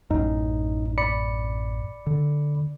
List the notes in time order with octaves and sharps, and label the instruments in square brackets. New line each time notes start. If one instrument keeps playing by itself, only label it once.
[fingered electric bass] A1 F#2 [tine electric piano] D#4
[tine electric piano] D5 B5 C#7
[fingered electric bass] D3